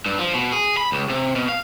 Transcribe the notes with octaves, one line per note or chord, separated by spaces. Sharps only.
G2
F3
B2
G#4
B5
C#2
C3
B2
F5